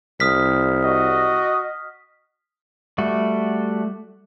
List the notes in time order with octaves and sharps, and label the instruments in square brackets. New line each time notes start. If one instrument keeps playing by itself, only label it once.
[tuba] C2 [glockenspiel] D#6 F6 B6
[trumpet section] F#4 D#5
[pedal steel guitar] G3 A3 F#4